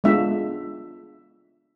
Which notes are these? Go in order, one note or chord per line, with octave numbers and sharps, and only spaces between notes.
G#3 B3 D4 F4 E5